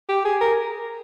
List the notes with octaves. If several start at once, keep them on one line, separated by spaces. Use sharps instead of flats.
G4
G#4
A#4